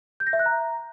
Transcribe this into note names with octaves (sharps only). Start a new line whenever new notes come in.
G6
A#6
E5
F#6
A#5